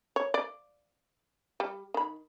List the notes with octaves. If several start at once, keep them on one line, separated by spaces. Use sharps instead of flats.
C#5
D5
G3
D#3 B5